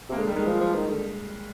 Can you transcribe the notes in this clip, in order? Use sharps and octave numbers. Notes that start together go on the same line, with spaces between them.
C3
A#3
D3 G#3
G3
D#3
G#3
F3
F3
D#3
D3